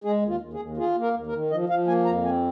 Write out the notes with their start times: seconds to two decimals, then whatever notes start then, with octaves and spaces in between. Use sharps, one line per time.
0.04 G#3 G#4
0.22 D#2
0.29 F4
0.41 D#2
0.54 G#4
0.60 D#2
0.77 F4 G#4
0.96 A#3
1.02 A#4
1.14 D#2
1.27 A#4
1.32 D#3
1.51 F3 D#5
1.69 F3 F5
1.87 A#3 G#5
2.05 F2 A#5
2.24 C4 G#5